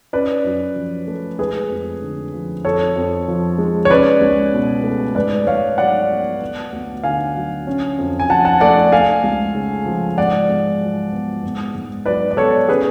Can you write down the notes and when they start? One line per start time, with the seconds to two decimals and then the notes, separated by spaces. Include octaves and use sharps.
0.13 C#4 B4 D5
0.45 F#2
0.76 F3
1.07 A3
1.38 G#3 G#4 B4
1.70 F2
2.02 D3
2.33 F3
2.64 F2 A4 C#5
2.96 F2
3.28 F3
3.58 G#3
3.85 C#5
3.90 C#4 B4 D5
4.21 C#2
4.53 B2
4.84 A3
5.15 G#2 B4 D5
5.47 G#2 C#5 F5
5.78 F#3 D5 F#5
6.10 B3
6.41 B3
6.73 D2
7.03 D3 F5 G#5
7.35 F#3
7.67 C#4
7.98 F2
8.20 G#5
8.29 F3 F#5 A5
8.45 F#5 A5
8.60 A3 D5 F#5
8.92 A3 F5 G#5
9.24 C#2
9.55 C#3
9.86 F3
10.18 G#2 D5 F#5
10.49 G#2
10.81 F#3
11.13 B3
11.44 G#2
11.75 G#2
12.06 F#3 B4 D5
12.31 D5
12.37 B3 A4 C#5
12.69 C#4 G#4 B4